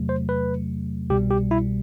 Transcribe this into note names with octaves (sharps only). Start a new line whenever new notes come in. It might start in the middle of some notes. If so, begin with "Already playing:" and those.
Already playing: E2 C3 F#3 A3
C5
B4
C2 B2 G3 G4
G4
E4